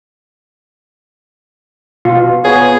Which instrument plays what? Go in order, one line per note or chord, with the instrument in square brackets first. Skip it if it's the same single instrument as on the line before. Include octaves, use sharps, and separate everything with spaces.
[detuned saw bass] B2 [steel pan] F4
[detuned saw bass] B3 [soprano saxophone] G#4 [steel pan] C#5